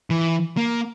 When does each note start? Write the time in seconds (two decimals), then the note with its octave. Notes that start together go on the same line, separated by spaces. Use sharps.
0.10 E3
0.57 A#3